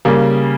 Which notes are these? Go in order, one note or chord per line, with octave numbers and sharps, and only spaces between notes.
C#3 G3 A#3